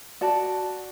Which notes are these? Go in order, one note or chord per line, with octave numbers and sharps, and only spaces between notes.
F#4 D5 A5